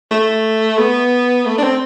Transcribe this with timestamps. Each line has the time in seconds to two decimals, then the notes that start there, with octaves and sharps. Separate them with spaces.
0.11 A3
0.79 B3
1.46 A3
1.58 D4
1.63 C4